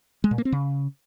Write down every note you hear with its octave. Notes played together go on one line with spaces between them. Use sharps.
G#3
A#2
A#3
C4
C#3